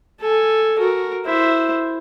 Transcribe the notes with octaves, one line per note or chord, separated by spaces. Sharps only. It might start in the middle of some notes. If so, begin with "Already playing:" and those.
A4 G#5
F#4 A#4
E4 C5